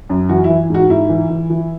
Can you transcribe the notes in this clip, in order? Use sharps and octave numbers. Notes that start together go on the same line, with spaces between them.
F#2
E3 F#4
E4
E3
G#2 F#4
G#2 E4
E3
E3
E3